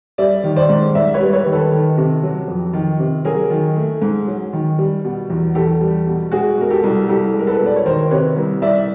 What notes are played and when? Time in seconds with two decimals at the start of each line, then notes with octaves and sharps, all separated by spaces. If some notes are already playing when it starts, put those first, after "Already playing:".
0.18 G3 D5 E5
0.44 D#3
0.56 C5 D5
0.69 G#2
0.95 G#2 D5 E5
1.14 B4 C#5
1.20 G3
1.33 B4 C#5
1.46 D#3
1.52 A4 B4
1.72 D#3
1.98 C3
2.23 F#3
2.48 F2
2.73 D#3
3.00 C3
3.25 F#3 G#4 A#4
3.50 D#3
3.77 A3
4.02 G#2
4.27 F#3
4.53 D#3
4.79 G3
5.04 B2
5.30 E2
5.55 E2 G4 A4
5.81 G3
6.07 B2
6.32 G#3 F#4 G#4
6.58 B2 A#4
6.70 G4 A4
6.84 C2
7.09 C2 G4 A4
7.34 G#3
7.39 A#4
7.47 A4 B4
7.60 B2
7.66 D5
7.76 C#5
7.86 D#3 A#4 C5
8.11 C3 B4 C#5
8.37 C2
8.62 C2 D5 E5